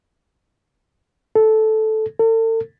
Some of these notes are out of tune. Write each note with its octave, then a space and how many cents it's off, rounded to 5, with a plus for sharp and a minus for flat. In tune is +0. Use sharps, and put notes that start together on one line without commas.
A4 -10
A4 +40